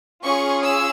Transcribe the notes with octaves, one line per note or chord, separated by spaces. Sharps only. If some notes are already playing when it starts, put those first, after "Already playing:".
C#4 F4 G#4 C#6
E6